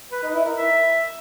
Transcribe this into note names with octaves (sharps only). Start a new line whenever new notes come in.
B4
D#4
E4
A#4
E5